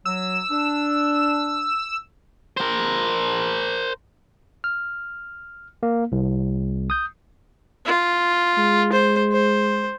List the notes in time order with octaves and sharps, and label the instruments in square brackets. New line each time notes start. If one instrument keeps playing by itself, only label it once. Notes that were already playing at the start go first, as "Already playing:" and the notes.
[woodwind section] F#3 [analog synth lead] E6
[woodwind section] D4
[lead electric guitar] A#4 C5
[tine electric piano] F6
A#3
C2
D#6 G6
[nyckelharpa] F4
[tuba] G#3
[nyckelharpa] C5
C5